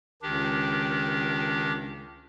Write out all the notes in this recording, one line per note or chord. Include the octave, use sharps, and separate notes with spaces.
C#2 D#3 D4 G4